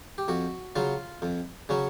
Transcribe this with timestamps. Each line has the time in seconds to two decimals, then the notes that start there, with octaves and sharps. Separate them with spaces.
0.18 G4
0.28 F2 F#4
0.76 C#3 F#3 F4
1.22 F2
1.69 C#3 F#3 C#4